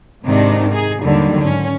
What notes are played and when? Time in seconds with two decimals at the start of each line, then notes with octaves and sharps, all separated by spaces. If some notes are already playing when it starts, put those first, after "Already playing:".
0.25 G#2 C3 D#3 D4 D#4
0.71 D#4 G#4
1.03 D#2 D3 D#3 F#3 G3
1.44 G#2 C#4